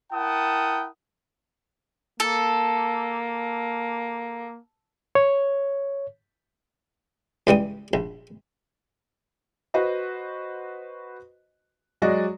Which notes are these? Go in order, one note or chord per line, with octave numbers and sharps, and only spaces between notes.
E4 A#4 F#5 G5 A5 D#6
A#3 A4
C#5
C#2 E3 G3 D#6
A#1
F#4 B4 C5 D#5
F#3 G#3 F#4 D5 D#5